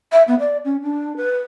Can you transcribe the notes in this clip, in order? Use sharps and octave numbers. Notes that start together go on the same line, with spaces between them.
E5
B3
D5
C#4
D4
B4